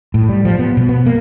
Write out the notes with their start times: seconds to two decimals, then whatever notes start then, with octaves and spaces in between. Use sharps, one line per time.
0.14 A2
0.29 G3
0.45 F3
0.59 B3
0.77 B2
0.89 B3
1.06 A#3